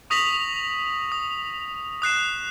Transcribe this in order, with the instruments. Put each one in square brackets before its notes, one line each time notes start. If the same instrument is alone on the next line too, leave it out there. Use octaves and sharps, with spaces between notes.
[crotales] C#6 D#6 A#6 B6 F7 F#7
D#6
D#6 F#6 C7 E7